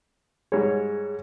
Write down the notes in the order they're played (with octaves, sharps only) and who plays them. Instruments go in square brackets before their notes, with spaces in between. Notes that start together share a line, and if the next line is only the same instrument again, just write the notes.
[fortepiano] G#2 G3 C#5 [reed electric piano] G#4